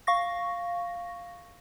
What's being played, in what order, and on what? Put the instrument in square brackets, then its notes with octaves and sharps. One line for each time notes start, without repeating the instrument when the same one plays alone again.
[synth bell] F5 C#6 A#6